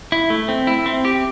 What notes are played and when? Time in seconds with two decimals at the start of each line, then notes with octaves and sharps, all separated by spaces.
0.12 E4
0.30 A3
0.48 C4
0.67 E4
0.86 C4
1.05 G4